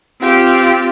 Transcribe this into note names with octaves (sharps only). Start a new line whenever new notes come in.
C4 F4 G4